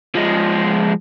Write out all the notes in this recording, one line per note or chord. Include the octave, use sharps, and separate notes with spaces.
F3 G#3